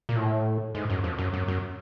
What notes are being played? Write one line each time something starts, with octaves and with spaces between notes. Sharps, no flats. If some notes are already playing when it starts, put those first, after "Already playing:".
A#2
A2
G#2
F#2
F2
F#2
F#2
F#2